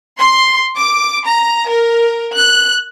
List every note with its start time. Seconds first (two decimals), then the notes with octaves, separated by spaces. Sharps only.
0.20 C6
0.75 D6
1.24 A#5
1.68 A#4
2.34 F#6